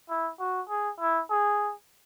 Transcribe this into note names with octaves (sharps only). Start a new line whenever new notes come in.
E4
F#4
G#4
E4
G#4